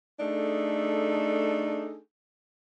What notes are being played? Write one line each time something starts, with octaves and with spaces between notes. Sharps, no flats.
A3 D4 D#4 G#4 A4